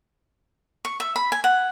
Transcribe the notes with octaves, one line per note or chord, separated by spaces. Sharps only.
C#6
E5
B5
G#5
F#5